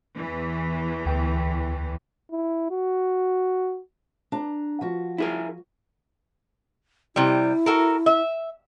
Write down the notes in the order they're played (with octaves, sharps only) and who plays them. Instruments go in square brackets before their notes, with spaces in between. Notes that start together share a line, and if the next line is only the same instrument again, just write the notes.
[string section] E2 E3
[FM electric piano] D2 G5
[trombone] E4
F#4
[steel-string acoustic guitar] D4 A#5
F3 F#4
[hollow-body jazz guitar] E4 G#4 A#4
[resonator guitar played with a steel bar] C3 G3 [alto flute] E4
[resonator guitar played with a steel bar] F#4 A4 A#4
E5